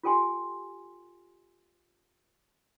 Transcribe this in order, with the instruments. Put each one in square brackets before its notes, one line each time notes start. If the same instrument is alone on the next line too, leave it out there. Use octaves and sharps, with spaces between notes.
[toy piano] F4 G4 A4 G5 G#5 C6